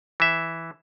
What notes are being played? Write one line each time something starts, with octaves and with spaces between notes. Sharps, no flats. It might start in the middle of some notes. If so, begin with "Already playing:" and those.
E3 E5